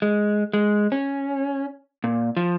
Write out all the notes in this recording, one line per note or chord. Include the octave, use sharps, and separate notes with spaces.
G#3
G#3
C#4
A#2
F3